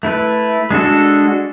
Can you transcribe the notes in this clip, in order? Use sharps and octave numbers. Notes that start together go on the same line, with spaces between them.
A3 E4 B4
G#3 D4 F#4 A4